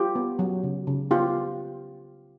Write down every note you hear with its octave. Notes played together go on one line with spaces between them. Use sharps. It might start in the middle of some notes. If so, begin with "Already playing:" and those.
Already playing: F4 G4
B3
F#3
C#3
C#3
B3 F4 G4